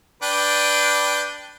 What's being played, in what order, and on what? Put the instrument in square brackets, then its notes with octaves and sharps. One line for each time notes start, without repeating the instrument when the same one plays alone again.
[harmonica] D4 B4 G5